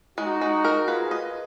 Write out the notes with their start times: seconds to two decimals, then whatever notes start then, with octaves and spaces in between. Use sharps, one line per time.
0.18 G#3 D#4 F#4
0.41 G#3
0.65 A#4
0.87 F4 G#4 B4
1.11 D#5